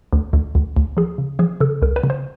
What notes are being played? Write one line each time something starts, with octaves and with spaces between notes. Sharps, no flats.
D2
D2
D2
D2
F3 G#4
C#3
F3 G#4
C#3 A4
C#2 A#4
B4
C#3
C5